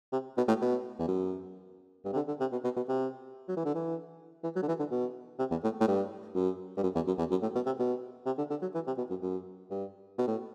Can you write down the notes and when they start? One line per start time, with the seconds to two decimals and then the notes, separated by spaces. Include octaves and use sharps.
0.12 C3
0.37 B2
0.48 A2
0.61 B2
0.99 E2
1.08 F#2
2.05 G2
2.13 C3
2.16 D3
2.28 D3
2.41 C3
2.52 B2
2.64 B2
2.77 B2
2.89 C3
3.48 F#3
3.57 E3
3.66 D3
3.75 E3
4.44 E3
4.56 F#3
4.62 D3
4.68 E3
4.79 D3
4.91 B2
5.39 C3
5.51 E2
5.64 A2
5.80 A2
5.88 G2
6.35 F#2
6.77 G2
6.83 F#2
6.95 E2
7.07 F#2
7.19 E2
7.31 F#2
7.42 A2
7.55 B2
7.66 C3
7.79 B2
8.26 C3
8.38 D3
8.50 D3
8.62 F#3
8.75 E3
8.87 C3
8.98 B2
9.10 F#2
9.22 F#2
9.70 G2
10.19 B2
10.27 A2